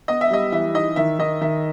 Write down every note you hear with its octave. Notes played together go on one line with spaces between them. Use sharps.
B3 D#5
E5
G3 D#5
E3 E5
D#4 D#5
D#3 E5
D#3 D#5
D#3 E5